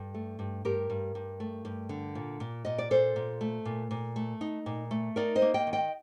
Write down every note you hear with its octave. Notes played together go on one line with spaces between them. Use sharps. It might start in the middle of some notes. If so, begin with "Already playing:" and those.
Already playing: G2 A4
A3
G2
G2 G4 A#4
G2
G2
A3
G2
D3
A#2
A#2
A#2 D#5
D5
A#2 A4 C5
A#2
A3
A#2
A#2
A3
D#4
A#2
A3
D#4 A#4 D5
C5 D#5
A#3
D#5 G5
D#3
D#5 G5